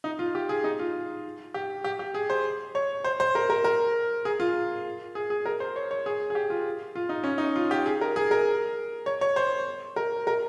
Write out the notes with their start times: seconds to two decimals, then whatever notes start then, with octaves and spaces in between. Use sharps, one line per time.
0.04 D#4
0.19 F4
0.35 G4
0.49 G#4
0.64 D#4
0.79 F4
1.54 G4
1.84 G4
1.99 G4
2.14 G#4
2.30 C5
2.75 C#5
3.04 C5
3.20 C5
3.35 A#4
3.50 A#4
3.64 A#4
4.25 G#4
4.40 F4
5.15 G#4
5.30 G#4
5.46 A#4
5.60 C5
5.76 C#5
5.91 C#5
6.06 G#4
6.30 G#4
6.35 G4
6.50 F4
6.96 F4
7.09 D#4
7.24 C#4
7.38 D#4
7.56 F4
7.71 G4
7.86 G#4
8.01 A#4
8.16 G#4
8.31 A#4
9.06 C#5
9.21 C#5
9.36 C5
9.96 A#4
10.27 A#4